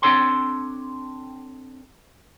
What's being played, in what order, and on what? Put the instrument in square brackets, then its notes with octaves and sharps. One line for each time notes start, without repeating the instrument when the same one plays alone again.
[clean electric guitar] C4 D4 A4 C#5 G5 C6